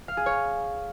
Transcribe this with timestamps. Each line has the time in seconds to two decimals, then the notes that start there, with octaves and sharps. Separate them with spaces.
0.08 F5
0.17 G#4
0.26 C#5